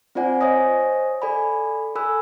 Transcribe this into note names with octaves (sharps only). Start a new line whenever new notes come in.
C4 F4 C5 D5 F#5 G#5
C5 C#5 D#5 G#5 D#6 A#6
A4 D5 G#5 B5
A4 G#5 B5 E6 F#6